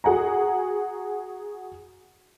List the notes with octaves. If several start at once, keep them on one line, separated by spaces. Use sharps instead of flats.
F#4 G#4 F#5 G#5 A#5